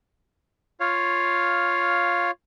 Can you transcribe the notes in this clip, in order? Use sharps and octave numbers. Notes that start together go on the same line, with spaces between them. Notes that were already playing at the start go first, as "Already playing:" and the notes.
F4 C#5 F5